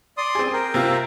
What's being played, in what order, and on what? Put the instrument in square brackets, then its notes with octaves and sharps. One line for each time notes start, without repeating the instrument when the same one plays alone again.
[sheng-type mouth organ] D5 C6 D#6
[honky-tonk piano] C4 G#4
[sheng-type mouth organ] A#4 G5
[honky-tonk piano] C3 C4 F4